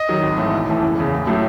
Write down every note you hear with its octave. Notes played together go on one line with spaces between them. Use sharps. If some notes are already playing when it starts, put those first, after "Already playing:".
Already playing: D#5
D#3 F#3
G#1
G#2 E3 A3
B1
A2 E3 A3
F#1
E2 C#3
A1
A2 F#3 A3